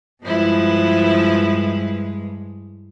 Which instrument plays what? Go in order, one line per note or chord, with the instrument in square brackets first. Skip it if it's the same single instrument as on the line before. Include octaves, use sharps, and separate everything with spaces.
[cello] G2 G#3 [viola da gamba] F3 E4 B4